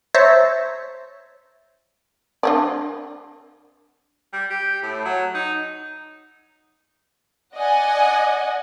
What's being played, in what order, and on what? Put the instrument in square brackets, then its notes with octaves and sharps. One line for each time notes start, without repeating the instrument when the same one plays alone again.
[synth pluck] C5 C#5 E5 A5 A#5
[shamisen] D4 A#4 D5
[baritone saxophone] G3
G4
A2
F#3
D#4
[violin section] D5 D#5 F#5 G#5